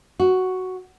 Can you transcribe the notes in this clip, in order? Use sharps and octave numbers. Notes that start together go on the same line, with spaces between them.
F#4